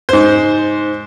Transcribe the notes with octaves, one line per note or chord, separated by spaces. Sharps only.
G#2 C5